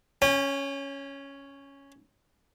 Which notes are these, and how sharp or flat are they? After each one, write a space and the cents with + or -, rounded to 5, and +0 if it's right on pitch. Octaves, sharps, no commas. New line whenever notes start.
C#4 +0 G#5 -40